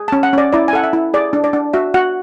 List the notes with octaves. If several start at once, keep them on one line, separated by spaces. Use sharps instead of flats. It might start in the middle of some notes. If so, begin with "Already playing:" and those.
Already playing: G#4
C#4 A5
F#5
C#4 D5
E4 D5
G#5
A4 F#5
E5
E4
G#4 D5
D4
D5
D4
F#4 E5
F#4 F#5